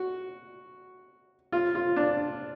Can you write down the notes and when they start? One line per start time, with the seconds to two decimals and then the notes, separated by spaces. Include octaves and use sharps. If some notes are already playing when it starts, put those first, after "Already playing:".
Already playing: F#4
1.52 F4
1.75 F4
1.96 D4